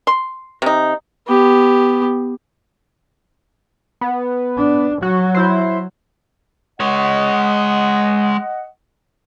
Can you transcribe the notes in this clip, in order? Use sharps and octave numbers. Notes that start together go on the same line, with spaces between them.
C6
C3 D#4
B3 G4
B3
D4
F#3 F#4
E4 C5
G#3 C#5 D#5 F#5